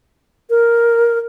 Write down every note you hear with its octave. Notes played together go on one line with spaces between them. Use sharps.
A#4